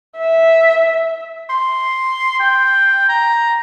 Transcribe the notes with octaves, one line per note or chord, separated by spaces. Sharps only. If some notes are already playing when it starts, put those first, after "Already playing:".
E5
C6
G5
A#5